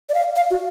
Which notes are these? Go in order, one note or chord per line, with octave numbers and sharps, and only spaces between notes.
D5
F5
F5
F#4